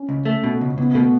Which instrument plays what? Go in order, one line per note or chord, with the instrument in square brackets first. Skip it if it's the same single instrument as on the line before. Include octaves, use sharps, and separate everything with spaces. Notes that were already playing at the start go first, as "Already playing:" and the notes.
Already playing: [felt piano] C#4
[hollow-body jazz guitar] C#2
A3
B2
C#2
[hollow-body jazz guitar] C#2 [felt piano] B3
[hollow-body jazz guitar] B2 [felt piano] A3